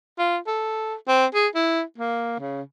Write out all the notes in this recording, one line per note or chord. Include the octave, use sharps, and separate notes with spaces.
F4
A4
C4
G#4
E4
A#3
C#3